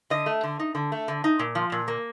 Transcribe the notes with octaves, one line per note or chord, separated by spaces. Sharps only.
D3 D#5
A3
D3
D#4
D3
A3
D3
D#4
A#2
F3
A#2
A#3